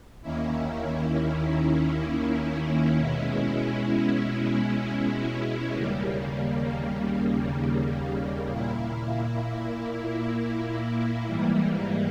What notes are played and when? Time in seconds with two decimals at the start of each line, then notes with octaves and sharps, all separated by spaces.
0.22 D#2 D#3 A#3 C#4 E4
2.98 B2 G#3 C#4 E4
5.73 D#2 C#3 G3 A#3
8.50 A#2 A#3 E4
11.26 G#2 E3 G3 A#3